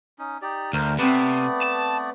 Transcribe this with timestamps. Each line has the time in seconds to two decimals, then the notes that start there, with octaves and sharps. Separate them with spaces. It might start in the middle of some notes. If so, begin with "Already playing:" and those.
0.19 C#4 D#4
0.42 D#4 G4 D5
0.73 D2 A#4 C5
0.99 C3 A3 B3 C4 B4 D5
1.62 A5